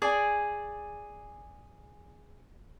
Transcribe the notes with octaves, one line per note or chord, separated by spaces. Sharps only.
G#4 D5 G#5